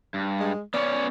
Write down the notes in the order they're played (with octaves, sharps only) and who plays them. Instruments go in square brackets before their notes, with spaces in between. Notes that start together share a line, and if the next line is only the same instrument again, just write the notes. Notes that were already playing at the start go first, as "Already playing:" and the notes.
[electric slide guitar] G2
[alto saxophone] G#3
[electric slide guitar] B3 C#4 C#5 [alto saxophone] D5